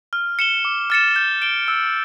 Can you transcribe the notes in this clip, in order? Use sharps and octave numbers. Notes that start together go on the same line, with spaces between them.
F6
C#7 E7 G7
D6
F6 A6 C#7 E7
G6
D7 G7
E6